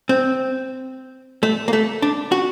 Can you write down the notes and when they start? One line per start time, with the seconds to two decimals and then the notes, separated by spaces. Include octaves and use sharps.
0.09 C4
1.43 A3
1.68 A#3
1.73 A3
2.02 D4
2.32 F#4